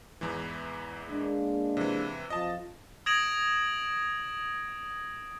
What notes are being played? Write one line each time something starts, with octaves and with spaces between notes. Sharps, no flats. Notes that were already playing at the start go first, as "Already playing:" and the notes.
E2 G#2 E3
G#3 A#3 D4
C3 E3
F2 F3 D#5 A5
D#6 G#6 A#6 D7 E7 F#7